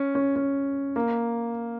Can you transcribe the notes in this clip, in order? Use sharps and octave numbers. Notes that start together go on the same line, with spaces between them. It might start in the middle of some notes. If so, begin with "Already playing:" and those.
Already playing: C#4
C#4
C#4
A#3